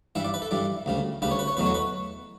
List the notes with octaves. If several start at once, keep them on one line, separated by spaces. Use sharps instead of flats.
G2 E3 G3 E5
D5
B4
A4
G2 E3 G3 D5
D2 C#3 G3
D2 C#3 G3 B4
C#5
B4
C#5
E2 B2 F#3 A3 B4
C#5
B4